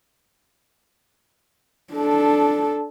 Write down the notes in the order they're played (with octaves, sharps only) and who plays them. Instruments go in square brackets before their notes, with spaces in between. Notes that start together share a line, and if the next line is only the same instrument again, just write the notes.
[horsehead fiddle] D4 A4